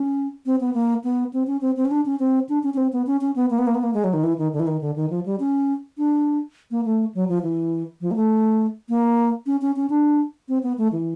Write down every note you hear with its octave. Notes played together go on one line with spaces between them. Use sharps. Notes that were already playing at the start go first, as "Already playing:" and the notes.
Already playing: C#4
C4
B3
A#3
B3
C4
C#4
C4
C4
C#4
D4
C#4
C4
D4
C#4
C#4
C4
B3
C#4
C#4
B3
A#3
B3
A#3
B3
A#3
G#3
F#3
D#3
E3
D#3
D3
E3
D#3
D3
D#3
F3
G3
C#4
D4
A#3
A3
F#3
F3
E3
F3
A#3
A3
A#3
C#4
C#4
C#4
D4
C4
B3
A3
E3